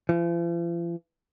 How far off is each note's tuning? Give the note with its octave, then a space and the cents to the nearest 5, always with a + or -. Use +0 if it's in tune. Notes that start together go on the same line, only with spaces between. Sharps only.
F3 -45